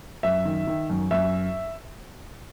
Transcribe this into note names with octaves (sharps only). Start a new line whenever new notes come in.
F#2 E5
D#3
D#3
F#2
F#2 E5